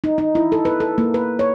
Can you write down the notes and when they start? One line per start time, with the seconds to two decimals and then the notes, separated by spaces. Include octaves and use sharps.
0.04 D#4
0.18 D#4
0.35 E4
0.52 A4
0.65 B4
0.80 A4
0.98 A#3
1.14 B4
1.39 C#5